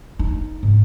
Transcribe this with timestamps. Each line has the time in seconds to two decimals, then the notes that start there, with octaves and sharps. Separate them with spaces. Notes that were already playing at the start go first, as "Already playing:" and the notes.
0.19 D#4
0.63 G#2